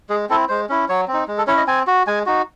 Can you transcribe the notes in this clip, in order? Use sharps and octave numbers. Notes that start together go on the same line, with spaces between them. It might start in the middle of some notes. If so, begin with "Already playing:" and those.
G#3 G#4
C4 E4 A4
G#3 C5
C#4 E4
F#3 C#5
C4
D#4
G#3
A4
C#4 E4 C#5
D#5
C4 G#5
F#4
G#3 G#5
D#4 F#4